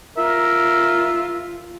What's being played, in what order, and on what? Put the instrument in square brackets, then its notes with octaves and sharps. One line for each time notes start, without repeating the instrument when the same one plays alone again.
[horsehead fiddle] F4 [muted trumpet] A#4 [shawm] E5